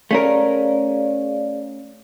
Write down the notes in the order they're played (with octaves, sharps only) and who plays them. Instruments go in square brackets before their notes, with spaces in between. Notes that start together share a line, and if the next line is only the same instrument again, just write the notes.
[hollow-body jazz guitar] A3 C#4 A#4 [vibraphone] G#4 D5 F5